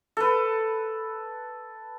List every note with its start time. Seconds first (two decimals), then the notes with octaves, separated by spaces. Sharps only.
0.17 A4 B4